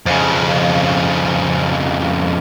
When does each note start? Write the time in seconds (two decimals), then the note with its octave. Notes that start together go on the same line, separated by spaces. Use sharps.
0.06 F2 C#3